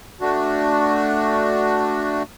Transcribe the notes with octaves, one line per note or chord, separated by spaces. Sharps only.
A3 D4 F#4